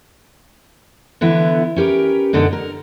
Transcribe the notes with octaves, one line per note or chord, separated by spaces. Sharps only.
D3 E3 B3 E4
C#4 G4 A#4 B4
F#2 B2 D3 B3 D4 D#4
A#4